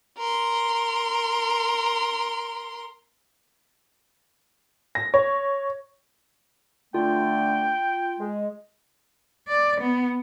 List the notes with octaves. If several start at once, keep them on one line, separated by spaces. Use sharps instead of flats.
A#4 C6
A#6
C#5
D3 A3 F4 G5
G#3
D5
B3